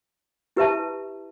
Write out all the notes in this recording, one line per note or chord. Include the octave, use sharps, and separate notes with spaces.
E4 G4 B4 E5 A5